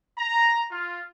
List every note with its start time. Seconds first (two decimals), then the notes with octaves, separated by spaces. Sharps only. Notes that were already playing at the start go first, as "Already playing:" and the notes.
0.16 A#5
0.71 F4